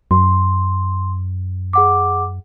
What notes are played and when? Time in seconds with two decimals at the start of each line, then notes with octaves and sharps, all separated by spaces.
0.11 F#2 C6
1.73 G#4 F#5 D6